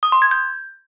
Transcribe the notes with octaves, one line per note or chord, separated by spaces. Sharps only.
D#6
C6
G#6
G6